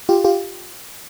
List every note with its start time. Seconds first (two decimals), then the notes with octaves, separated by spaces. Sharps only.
0.09 F4 G4
0.24 F4 G4